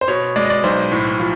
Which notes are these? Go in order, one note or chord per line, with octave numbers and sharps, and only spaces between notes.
C5
B2 C#5
G#3 D5
D#5
D5
B1 C5
A2
F3